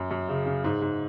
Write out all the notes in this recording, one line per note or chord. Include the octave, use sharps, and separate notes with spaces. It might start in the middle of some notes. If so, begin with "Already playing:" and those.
Already playing: F#2
F#2
C#3
C#3
G#2
G#2